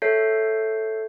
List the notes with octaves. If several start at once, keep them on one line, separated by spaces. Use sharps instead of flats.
A4 C#5 E5 G6 C7